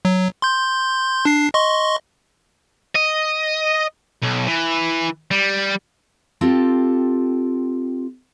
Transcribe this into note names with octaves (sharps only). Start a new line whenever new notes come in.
F#3
C6 G6
D4 C7
D#5 C6 C#6
D#5
B1
E3
G3
C4 F4 G4 A4